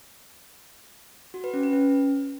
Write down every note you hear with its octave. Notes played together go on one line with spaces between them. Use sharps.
F#4
B4
C#4
B4
C#4